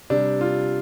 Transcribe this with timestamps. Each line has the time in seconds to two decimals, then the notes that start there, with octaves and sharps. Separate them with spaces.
0.10 C3 G3 D4
0.41 F4